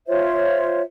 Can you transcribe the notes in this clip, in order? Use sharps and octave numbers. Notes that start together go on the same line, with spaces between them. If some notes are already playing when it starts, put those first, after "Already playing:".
F4 C5 C#5 E5